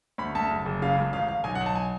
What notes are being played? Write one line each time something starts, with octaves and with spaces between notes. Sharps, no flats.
D2 B5
D2 A5
F#1
F#1
C#3 F5
C#2
A1 F5
A1 F5
B1 G#5
F#5
B1
A5
G#5